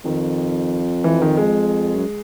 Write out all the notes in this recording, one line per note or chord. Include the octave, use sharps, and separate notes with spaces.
F2 D#3
E3
D#3
G#3
F#2